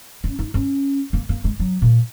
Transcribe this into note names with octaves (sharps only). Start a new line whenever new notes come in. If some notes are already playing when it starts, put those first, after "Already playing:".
C#4
D#4
C#4
A#3
A#3
G#3
F#3
A#2